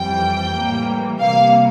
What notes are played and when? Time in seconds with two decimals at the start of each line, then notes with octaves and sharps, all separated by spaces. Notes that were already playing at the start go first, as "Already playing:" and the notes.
Already playing: F2 E3 G3 G5
0.53 A2 E3 G3 A#3
1.21 C3 G3 A#3 F5